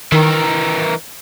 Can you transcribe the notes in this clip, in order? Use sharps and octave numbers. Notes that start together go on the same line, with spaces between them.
D#3 E3 A#4